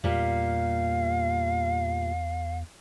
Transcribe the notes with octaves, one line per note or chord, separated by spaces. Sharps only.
E2 A#2 G3 F5